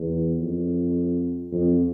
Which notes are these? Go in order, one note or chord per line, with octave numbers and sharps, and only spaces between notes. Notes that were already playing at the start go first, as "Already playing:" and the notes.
Already playing: E2
F2
F2